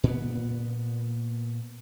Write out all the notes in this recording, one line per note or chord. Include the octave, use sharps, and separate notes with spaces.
A#2 B3